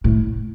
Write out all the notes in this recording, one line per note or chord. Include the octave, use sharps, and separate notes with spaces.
A2